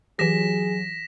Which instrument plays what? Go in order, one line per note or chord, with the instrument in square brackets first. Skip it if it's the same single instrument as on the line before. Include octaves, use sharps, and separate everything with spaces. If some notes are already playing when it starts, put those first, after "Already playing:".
[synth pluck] E3 G4 [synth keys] F#3 [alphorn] G#4 [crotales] A#6 B6 E7